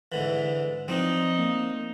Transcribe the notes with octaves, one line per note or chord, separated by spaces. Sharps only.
G#2 D3 E3
F3 C4 D4 D#4
A#3